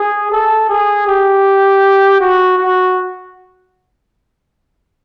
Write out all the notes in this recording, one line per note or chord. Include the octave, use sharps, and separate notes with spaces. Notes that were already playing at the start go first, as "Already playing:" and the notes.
Already playing: G#4
A4
G#4
G4
F#4
F#4